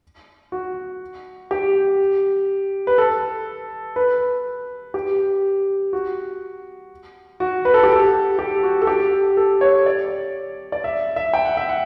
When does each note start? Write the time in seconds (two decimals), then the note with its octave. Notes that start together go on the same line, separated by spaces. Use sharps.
0.52 F#4
1.51 G4
2.87 B4
2.98 A4
3.96 B4
4.94 G4
5.93 F#4
7.40 F#4
7.65 B4
7.74 A4
7.83 G4
7.92 A4
8.39 G4
8.63 F#4
8.82 A4
8.87 G4
9.37 A4
9.61 C#5
9.86 D5
10.72 D5
10.84 E5
11.16 E5
11.34 G5
11.45 F#5
11.57 E5
11.69 F#5